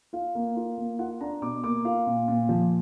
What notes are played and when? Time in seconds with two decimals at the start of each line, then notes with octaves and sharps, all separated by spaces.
0.13 F4 F5
0.35 A#3
0.56 F4
0.78 A#3
0.99 F4 F#5
1.21 D4 A#5
1.42 B2 D6
1.64 A#3 D6
1.85 F4 F5
2.06 A#2
2.28 A#2
2.49 F3